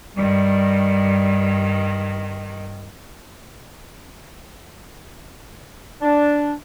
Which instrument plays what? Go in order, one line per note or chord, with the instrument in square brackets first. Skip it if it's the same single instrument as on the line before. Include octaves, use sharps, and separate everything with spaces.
[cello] G2 D#3 [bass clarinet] G3
[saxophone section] D4